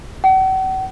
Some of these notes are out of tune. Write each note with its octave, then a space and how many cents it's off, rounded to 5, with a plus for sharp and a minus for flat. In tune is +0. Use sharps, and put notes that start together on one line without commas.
F#5 +45